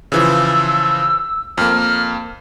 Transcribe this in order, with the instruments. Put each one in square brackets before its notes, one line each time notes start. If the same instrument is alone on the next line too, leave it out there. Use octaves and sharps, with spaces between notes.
[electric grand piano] C#3 E3 F3 [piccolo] E6
[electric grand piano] F2 A#3 [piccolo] F6